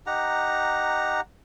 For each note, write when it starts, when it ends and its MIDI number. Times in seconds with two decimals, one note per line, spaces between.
0.06 1.21 63
0.06 1.21 67
0.06 1.21 78
0.06 1.21 82